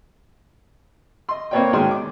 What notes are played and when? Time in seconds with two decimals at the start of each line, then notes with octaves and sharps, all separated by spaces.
1.29 D#5 C6
1.51 A#3 C4 B4 C#5 D5 G5
1.73 G#2 B2 D#3 C#4 G#4 C6
1.91 D6